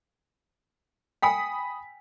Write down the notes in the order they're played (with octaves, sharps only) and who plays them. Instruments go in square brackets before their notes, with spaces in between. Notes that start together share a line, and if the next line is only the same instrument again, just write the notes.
[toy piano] G5 G#5 [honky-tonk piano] B5 D#6 B6